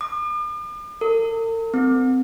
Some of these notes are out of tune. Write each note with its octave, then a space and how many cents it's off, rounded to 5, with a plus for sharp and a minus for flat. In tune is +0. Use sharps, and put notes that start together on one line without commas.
D6 +45
A#4 -45
C4 -30